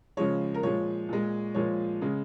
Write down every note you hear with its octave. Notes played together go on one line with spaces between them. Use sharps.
C#3 F3 G#3 C#5
A#4
A#2 F3 G#3 C#5
A#2 G#3
A#2 F3 G#3 C#5
C#3 G#3